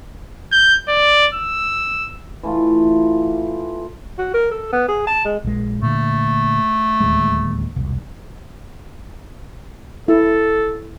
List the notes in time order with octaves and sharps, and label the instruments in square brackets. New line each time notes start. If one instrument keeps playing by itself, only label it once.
[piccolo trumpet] G6
D5
E6
[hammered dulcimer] E3 A3 F4
[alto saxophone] F#4
A#4
A4
B3
G#4
A5
G#3
[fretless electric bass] A#1 G#3
[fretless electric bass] A#2 D3 [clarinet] A3
[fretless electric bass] D1 D#2 G#3
E1 C2
[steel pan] E4 [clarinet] A4